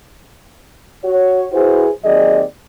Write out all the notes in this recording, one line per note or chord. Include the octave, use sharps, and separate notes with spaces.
F#4 C#5
E4 F#4 G#4 B4 C5
D#2 F#3 C4 G#4 D5 D#5